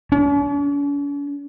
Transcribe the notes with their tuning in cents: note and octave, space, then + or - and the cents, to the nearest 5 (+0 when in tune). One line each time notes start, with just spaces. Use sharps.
C#4 +45